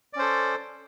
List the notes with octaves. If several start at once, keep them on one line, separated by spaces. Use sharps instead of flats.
C#4 A4 C5 D5